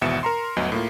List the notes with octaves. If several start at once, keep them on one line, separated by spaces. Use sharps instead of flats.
G#1 E2 B2 E5 C#7 E7
A#4 A#5 C6
G1 D2 F#3 B3 D#5
A2 A#3 F4